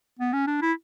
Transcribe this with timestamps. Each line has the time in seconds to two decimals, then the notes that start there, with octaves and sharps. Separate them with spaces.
0.19 B3
0.33 C#4
0.47 D4
0.62 E4